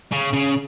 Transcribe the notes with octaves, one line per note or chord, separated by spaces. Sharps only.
C#3
C#3